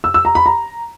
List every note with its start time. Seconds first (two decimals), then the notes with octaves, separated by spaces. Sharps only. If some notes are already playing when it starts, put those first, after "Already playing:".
0.04 E6
0.14 E6
0.25 A#5
0.35 B5
0.46 A#5